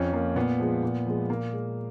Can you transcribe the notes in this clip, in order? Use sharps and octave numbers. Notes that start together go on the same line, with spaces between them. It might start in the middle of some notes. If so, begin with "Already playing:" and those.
Already playing: F2 C#4
F3 A#3
A#2 B3
F3 G#3
A#2
F3 G#3
A#2 A#3
G#3